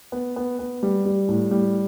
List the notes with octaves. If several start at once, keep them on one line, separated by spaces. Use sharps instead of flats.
B3
B3
B3
G3
G3
A2
G3